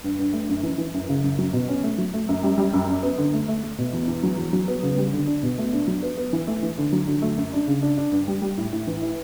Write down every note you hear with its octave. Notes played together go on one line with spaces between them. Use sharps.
G2
G2
A3
F#2
E3
E3
F#2
C#3
F#2
F#3
B2
C#4
A3
F#3
A3
F#2
G3
G3
F#2
F#2
B3
D3
A3
A3
A3
B2
E2
E2
F#3
E2
F#3
B3
C#3
G3
D3
D4
B2
A3
D4
F#3
B3
B3
E3
A3
E3
D3
F#3
D3
A3
F#2
D4
C#3
D4
D4
G2
G3
G3
A2
A2
E3
E4